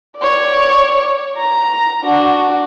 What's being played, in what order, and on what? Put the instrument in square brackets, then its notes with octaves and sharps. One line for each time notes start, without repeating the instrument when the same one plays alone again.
[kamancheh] C#5 D5
A#5
D4 F#4